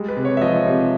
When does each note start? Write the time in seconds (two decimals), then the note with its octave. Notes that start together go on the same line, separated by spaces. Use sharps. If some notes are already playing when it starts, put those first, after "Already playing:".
Already playing: G3 G#3
0.08 B4
0.17 C3
0.25 C#5
0.37 E5
0.41 F3 D#5
0.66 C3